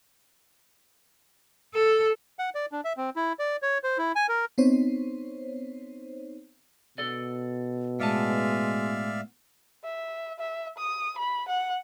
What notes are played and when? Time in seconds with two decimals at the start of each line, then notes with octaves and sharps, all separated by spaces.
1.74 A4
2.39 F#5
2.55 D5
2.72 D4
2.85 E5
2.97 C4
3.16 E4
3.39 D5
3.62 C#5
3.84 C5
3.98 E4
4.15 G#5
4.29 A#4
4.58 B3 C4 D#4 C5 C#5
6.98 B2 A4 D5
8.00 A2 G#3 B3 D5 E5 F5 A5
9.84 E5
10.39 E5
10.78 D#6
11.18 B5
11.48 F#5